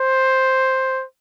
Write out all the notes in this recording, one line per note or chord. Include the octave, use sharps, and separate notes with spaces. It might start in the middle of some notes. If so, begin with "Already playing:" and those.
Already playing: C5